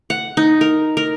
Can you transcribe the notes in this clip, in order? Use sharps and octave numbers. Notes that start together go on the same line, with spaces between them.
F#5
D#4
A#4
A#4